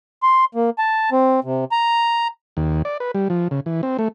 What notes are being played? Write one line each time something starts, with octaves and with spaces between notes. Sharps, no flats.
C6
A#3
A5
C4
C3
A#5
D#2
D5
B4
G3
F3
C#3
E3
C4
A3